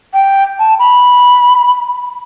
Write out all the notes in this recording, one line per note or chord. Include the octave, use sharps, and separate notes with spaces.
G5
A5
B5